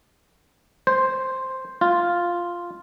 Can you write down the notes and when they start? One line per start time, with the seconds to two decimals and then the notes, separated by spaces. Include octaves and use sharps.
0.87 C5
1.81 F4